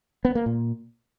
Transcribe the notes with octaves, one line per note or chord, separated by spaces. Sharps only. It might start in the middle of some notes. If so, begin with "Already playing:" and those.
B3
A#3
A#2